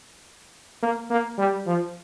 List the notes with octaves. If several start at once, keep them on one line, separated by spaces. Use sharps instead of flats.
A#3
A#3
G3
F3